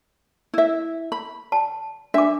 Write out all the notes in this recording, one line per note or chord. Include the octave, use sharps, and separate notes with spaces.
E4 E5
B5
A5
D4 E5 D6